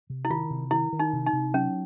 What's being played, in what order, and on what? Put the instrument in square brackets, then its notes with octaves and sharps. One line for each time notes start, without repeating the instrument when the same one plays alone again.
[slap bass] C3
[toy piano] E4
[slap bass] D#3 [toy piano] F4
[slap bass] C3
[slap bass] D#3 [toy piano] E4
[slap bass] D#3
[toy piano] D#4
[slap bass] C3
[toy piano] D#4
[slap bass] C3
[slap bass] F#3 [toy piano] C#4